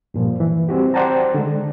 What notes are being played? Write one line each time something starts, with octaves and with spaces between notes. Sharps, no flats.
G2 A#2 F3
E3
G3 C4 F#4 G4
C5 D5 F#5 G5 A5 A#5
D3 G#3